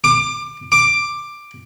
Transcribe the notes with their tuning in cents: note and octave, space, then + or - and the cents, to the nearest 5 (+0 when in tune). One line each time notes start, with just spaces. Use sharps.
D6 +25
D6 +10